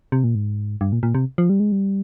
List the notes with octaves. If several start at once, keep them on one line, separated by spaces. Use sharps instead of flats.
C3
A#2
G#2
G2
A#2
A#2
C3
F3
G3
G#3
G3